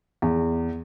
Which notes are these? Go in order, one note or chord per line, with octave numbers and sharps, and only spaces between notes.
E2